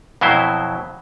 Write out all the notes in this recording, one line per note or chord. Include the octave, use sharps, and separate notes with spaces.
F2 B2 F#3 E4 C5